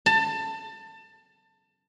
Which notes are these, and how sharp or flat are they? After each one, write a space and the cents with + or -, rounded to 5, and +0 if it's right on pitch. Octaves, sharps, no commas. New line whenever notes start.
A5 +25